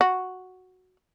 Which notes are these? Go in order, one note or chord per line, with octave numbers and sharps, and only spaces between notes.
F#4